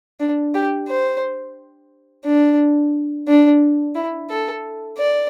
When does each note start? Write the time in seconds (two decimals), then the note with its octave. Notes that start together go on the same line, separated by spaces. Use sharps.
0.20 D4
0.54 G4
0.88 C5
2.25 D4
3.28 D4
3.95 E4
4.30 A4
4.98 D5